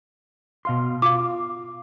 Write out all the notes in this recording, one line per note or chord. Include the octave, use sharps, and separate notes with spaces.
B2 F5 C6
F4 F5 D6